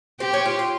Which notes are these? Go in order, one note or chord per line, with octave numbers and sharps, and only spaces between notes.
C4 G4
C#4
F4
F4